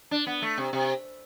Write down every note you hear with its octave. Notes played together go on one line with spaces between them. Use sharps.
D4
B3
A3
C3
C3